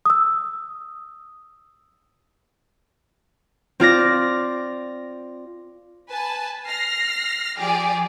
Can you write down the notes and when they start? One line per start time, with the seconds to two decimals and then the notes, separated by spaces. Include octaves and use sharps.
0.06 D#6 E6
3.80 C4 F4 D5 A#6
6.10 B4 G#5 A5
6.68 F6 A#6 C7
7.59 F3 G4 G#4 D5